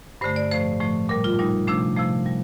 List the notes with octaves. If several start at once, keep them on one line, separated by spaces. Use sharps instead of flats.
G2 D3 A3 C5
D5
A2 F3 A3 C5
A2 F3 A3
A#2 G3 A#4
F4
A#2 G3 D#4
C3 F3 A3 D4
C3 F3 A3
G3